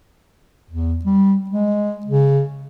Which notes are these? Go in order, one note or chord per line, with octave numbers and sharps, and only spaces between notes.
E2
G3
G#3
C#3